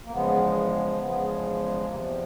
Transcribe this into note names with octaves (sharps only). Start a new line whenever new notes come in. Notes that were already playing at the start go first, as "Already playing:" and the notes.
A#3
E2 C#3 F3 G#3 B3
E2 C#3 F3 G#3 B3
E2 C3 F3 A#3